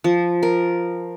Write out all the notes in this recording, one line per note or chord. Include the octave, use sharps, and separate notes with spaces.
F3
A#4